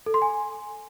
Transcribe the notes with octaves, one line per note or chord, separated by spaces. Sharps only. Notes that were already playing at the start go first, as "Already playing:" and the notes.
A4
C6
G#5